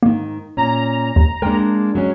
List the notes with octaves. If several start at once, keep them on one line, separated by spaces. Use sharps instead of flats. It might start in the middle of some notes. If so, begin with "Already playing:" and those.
G#2 D#3 A#3
A#2 C#4 A#5
D#2
G#3 A#3 D4 A#4 G5
F#3 G#3 C#4